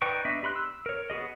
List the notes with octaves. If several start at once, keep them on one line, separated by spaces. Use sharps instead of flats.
D#4 B4 D5 G5 C#6
B3 D4 D#5 E5
G4 B5 C6 F#6
E6
A#4 C#5
B3 F#4 G#4 D#5